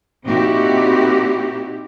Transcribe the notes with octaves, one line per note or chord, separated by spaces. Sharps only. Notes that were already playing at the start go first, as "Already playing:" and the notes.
A#2 C4 D#4 E4 F#4 G4